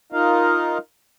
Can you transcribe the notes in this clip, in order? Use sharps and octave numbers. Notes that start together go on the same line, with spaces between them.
D#4 F4 A#4 D#5 F5